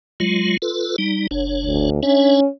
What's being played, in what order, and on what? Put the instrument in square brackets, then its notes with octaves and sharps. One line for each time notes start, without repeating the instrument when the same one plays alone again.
[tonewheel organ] F#3 G#3 F4
F4 A4 B4
G3 D#4
F#1 D4 C#5
[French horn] D2
[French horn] C#4 [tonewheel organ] D4 C#5 E5